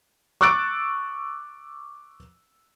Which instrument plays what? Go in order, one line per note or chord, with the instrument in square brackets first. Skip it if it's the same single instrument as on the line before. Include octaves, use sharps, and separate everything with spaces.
[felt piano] C#6 D6 E6 F#6 A6 D7